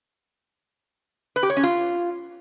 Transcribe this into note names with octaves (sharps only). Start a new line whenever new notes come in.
B4
G4
C#5
C#4
F4